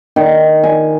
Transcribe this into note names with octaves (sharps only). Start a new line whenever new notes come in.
D#3
G#5